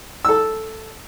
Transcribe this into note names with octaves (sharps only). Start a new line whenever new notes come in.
A4 E6